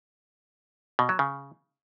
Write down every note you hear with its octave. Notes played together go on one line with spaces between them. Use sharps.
B2
F#3
C#3